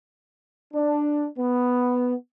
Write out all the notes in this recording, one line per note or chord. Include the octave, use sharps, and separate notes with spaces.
D4
B3